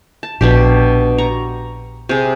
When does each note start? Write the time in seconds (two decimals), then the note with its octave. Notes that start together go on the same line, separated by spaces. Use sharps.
0.23 A5
0.41 A#1 B2 D4 G4
1.18 A#5 C#6
2.09 C3 G#4